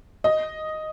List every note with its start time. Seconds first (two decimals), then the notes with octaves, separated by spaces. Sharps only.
0.24 D#5